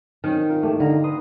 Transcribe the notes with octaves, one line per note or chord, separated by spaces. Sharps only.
D#3 F#3 C4 C#4
F4 A#4
G#2 E3 A3 G4
D3 D#4 F5 A#5
B4 C6 D#6